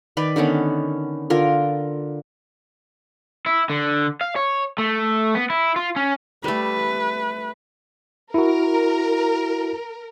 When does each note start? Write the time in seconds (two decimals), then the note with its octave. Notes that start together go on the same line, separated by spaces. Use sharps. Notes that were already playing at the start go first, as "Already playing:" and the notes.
0.17 D#3 B4 D5
0.36 D3 D#3 B3 C#4
1.30 D3 F4 A#4
3.46 E4
3.70 D3
4.21 F5
4.36 C#5
4.78 A3
5.35 B3
5.50 E4
5.76 F4
5.96 C#4
6.44 G3 A3 B4
8.34 E4 F#4 A#4